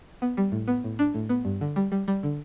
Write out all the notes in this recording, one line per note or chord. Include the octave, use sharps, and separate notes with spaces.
B3
G3
A2
B3
A2
D4
A2
B3
G2
D3
G3
G3
G3
D3